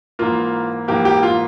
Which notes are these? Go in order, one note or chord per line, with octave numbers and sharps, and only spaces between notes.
G#2 E3 A#3 F4
G#2 E3 A#3 G4
G4
F4